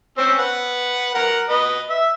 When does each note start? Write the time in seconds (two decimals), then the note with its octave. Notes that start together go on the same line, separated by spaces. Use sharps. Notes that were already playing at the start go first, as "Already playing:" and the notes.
0.17 C4 C#4 E6
0.38 B4 F#5
1.15 A#4 F#5
1.49 B4 D#5
1.90 E5